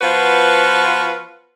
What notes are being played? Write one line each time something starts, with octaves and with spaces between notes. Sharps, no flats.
F3 B3 F4 F#4 B4 C5